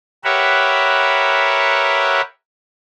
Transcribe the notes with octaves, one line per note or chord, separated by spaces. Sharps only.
G4 A#4 B4 C#5 E5 F#5